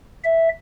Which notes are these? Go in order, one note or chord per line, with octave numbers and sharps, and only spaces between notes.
E5